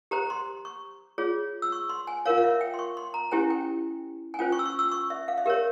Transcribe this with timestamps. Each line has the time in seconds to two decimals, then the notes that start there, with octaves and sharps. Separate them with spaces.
0.11 G4 C5 A#5
0.30 C6
0.65 C#6
1.18 F4 G#4 C#5
1.62 E6
1.72 C#6
1.89 C6
2.07 G#5
2.25 F4 A#4 C#5 F5
2.37 F5
2.43 E5
2.61 G5
2.74 C6
2.79 C#6
2.97 C6
3.14 A#5
3.31 C#4 E4 G4 C5 G#5
3.50 G5
4.34 G#5
4.39 C#4 F4 C5 G5
4.52 C#6
4.59 E6
4.65 C#6
4.79 E6
4.92 C#6
5.10 E5
5.28 F5
5.38 E5
5.46 G4 A#4 C#5 F5